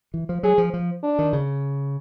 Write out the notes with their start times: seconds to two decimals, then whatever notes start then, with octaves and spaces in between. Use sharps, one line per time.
0.14 E3
0.29 F3
0.43 F#3 G#4
0.58 F3
0.74 F3
1.03 D4
1.19 D#3
1.33 C#3